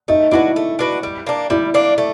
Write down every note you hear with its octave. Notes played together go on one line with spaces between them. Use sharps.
A3 D#4
D4 E4 F#4 B4
A3
D4 F#4 B4
G3
A#3 D4
G3 E4
A#3 D4
A3